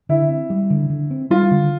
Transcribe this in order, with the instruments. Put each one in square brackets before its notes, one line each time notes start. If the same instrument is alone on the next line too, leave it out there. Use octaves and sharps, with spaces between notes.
[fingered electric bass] D3 [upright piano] E4
[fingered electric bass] C4
G3
D3
D3
C4
[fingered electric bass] G3 [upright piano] F4
[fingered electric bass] D3